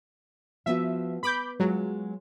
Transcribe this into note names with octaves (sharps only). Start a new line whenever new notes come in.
F3 B3 F#4 E5
B4 B5 D6 G6
F#3 G#3 F4